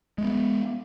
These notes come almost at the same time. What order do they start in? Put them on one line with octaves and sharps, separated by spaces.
G#3 A3 B3